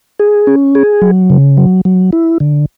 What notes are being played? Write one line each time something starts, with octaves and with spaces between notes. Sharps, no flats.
G#4
C#4
G#4
F#3
C#3
F#3
F#3
E4
D3